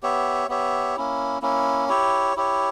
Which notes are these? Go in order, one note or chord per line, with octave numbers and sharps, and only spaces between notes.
B3 G4 C#5 E5
B3 G4 C#5 E5
A#3 C#4 E4
A#3 C#4 E4
E4 G4 C#5
E4 G4 C#5